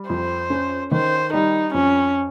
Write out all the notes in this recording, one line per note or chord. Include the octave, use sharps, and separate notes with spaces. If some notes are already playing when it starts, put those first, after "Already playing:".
Already playing: G3
F2 C5
C#4
D#3 C5
G3 D#4
F2 C#4